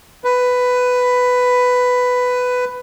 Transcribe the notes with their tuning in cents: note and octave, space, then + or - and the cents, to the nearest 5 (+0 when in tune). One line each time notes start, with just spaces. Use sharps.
B4 +10